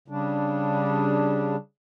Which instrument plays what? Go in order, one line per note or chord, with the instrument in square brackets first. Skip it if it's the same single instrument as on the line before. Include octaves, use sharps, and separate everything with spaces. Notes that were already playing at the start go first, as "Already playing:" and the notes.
[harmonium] C#3 G3 D4